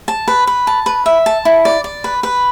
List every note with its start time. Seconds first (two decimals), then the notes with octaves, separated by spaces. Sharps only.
0.08 A5
0.28 B4
0.47 B4
0.67 A5
0.86 B4
1.06 E5
1.26 A5
1.45 E4
1.65 D5
1.84 D5
2.04 B4
2.23 B4